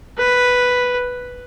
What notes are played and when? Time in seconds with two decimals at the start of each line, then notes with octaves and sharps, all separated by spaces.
0.18 B4